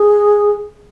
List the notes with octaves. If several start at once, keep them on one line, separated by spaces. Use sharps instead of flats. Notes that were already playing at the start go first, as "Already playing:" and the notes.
Already playing: G#4